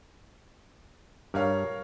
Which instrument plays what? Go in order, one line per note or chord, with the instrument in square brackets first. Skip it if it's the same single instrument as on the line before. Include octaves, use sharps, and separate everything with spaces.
[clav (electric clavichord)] G2 [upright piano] A#4 C#5 F5